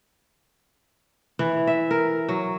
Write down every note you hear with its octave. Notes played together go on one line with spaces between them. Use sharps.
E3
E5
A#4
F#3